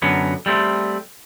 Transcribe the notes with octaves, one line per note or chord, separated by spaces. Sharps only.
F#2 D3 F#3 B3
G3 A3 C4